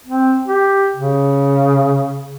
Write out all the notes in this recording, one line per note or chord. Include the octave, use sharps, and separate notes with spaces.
C4
G4
C#3